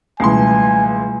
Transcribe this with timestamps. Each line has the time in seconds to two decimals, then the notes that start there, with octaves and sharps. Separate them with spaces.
0.20 C#2 B2 E3 G3 A3 G#5 C6